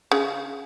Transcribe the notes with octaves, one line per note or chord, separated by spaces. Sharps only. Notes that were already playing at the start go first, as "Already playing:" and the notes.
C#3